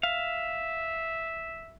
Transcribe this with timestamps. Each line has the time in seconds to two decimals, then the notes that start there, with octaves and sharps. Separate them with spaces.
0.03 E5 F5